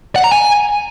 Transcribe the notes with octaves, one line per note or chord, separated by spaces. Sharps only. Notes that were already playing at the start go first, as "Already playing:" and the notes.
F#5
A#5
G#5